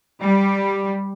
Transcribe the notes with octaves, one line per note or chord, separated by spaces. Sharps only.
G3